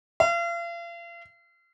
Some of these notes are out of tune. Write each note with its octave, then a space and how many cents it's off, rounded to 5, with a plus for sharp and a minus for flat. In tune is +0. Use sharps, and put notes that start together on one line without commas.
F5 -40